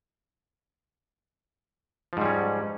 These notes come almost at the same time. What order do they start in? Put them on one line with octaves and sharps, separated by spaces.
F3 G#2 G3 C#4